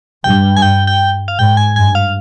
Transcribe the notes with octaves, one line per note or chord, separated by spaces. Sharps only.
G2 G5
G#5
G5
G5
F5
G#2 G5
G#5
G2 G#5
F5